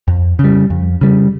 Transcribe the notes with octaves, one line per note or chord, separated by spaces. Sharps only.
F2
C#3
G3
F2
C#3 G3